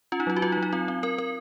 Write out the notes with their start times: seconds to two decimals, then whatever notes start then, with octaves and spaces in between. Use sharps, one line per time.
0.12 C#4 F4
0.20 D#4
0.27 F#3 F4
0.37 F#4
0.42 F#3 F4
0.52 D#4
0.57 F#3
0.63 D#4
0.73 C4 F4
0.88 C4
1.03 C4 A#4
1.18 C4 A#4